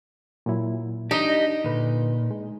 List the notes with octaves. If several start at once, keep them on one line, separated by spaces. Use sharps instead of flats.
A#2 F#3 E4
D4 D#4 G4 D#5
A#2 D3 B4
G#3